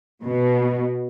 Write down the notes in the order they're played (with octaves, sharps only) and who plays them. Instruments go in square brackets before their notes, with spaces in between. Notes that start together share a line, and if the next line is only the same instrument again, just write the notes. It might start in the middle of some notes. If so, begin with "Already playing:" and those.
[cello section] B2